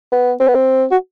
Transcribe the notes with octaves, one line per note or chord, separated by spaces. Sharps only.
B3
C4
B3
C4
F#4